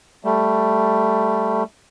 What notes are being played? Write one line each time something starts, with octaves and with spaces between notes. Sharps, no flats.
G3 A3